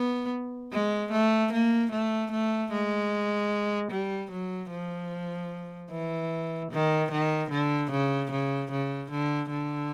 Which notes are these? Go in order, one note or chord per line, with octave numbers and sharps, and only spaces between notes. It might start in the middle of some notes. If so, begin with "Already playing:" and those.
Already playing: B3
G#3
A3
A#3
A3
A3
G#3
G3
F#3
F3
E3
D#3
D#3
D3
C#3
C#3
C#3
D3
D3